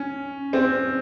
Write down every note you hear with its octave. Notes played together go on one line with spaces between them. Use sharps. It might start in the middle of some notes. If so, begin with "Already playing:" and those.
Already playing: C#4
C4